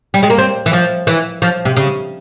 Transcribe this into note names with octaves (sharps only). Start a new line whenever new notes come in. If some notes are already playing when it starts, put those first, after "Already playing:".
G3
G#3
A#3
C4
E3
F3
E3
F3
C3
C#3